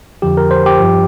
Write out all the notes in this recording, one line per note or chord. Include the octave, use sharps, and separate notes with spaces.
F2 D3 F3 G4
A#4
C5
G4
G2 F3